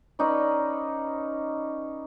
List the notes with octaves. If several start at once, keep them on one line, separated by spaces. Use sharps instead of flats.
C#4 D#4 B4 D5